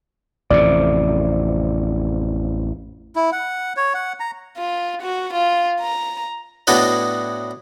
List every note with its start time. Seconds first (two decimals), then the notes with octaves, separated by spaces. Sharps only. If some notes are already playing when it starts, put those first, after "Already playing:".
0.51 A1 F2 C3 D5
3.16 E4
3.32 F#5
3.77 C#5
3.94 F#5
4.20 A#5
4.57 F4
5.02 F#4
5.33 F4
5.81 A#5
6.67 A2 B3 D4 F#4 D5 D#5